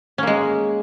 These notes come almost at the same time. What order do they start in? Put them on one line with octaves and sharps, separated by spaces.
C#4 A#3 G#3